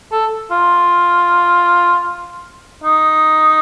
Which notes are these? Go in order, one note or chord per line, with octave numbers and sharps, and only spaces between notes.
A4
F4
D#4